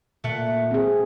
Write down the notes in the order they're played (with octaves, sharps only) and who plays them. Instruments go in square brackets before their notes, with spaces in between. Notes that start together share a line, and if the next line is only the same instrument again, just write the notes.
[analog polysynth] A#2 [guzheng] A3 F#5
[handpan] C4 G#4